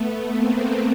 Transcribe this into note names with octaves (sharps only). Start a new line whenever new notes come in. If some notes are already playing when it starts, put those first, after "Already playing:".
Already playing: A3 B3
A#3 C4